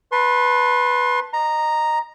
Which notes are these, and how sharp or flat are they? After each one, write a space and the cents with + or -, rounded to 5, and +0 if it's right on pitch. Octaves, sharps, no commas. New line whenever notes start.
B4 +0 A5 +0 C6 +30
D#5 -25 A#5 +0